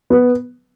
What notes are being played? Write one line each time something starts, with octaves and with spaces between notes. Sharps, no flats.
B3